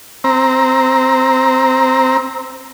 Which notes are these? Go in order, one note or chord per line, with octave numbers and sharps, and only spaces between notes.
C4 A#5